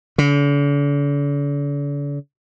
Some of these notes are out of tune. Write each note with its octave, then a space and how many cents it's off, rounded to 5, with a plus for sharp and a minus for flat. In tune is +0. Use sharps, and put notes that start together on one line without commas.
D3 -45